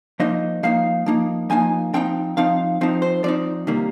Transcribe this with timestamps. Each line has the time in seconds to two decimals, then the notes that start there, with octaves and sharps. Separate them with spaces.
0.20 F3 A#3 D#4 D#5
0.63 F3 A#3 D#4 F5
1.06 F3 A#3 D#4
1.50 F3 A#3 D#4 G#5
1.94 F3 C4 D#4 G5
2.37 F3 C4 D#4 F5
2.81 F3 C4 D#4
3.02 C5
3.24 F3 C4 D#4 D5
3.67 C3 D#3 G3 A#3